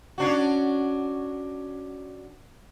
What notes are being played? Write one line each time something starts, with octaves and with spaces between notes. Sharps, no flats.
C#4 D4 F#4